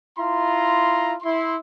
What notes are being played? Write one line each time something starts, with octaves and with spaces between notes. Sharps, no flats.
E4 F4 A#5 C6
E4 C6